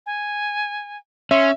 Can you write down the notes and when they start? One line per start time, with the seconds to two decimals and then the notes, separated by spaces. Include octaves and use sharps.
0.06 G#5
1.31 C#4 E5 C6